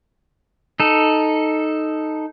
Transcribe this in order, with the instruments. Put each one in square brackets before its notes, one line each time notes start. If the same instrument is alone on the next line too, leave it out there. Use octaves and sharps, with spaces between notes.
[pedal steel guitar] D#4 A4